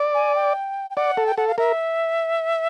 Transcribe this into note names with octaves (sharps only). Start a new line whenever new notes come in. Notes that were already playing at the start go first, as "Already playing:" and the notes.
Already playing: D5
G#5
G5
G5
D5 F#5
A4
G5
A4 F#5
F5
A#4 E5